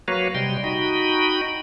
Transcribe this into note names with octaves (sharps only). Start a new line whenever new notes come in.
F#3 A#3 F#4 B4 C#5 F5
C3 G3 D#5 G5 C6
D#4 F#4 D#5 G5 B5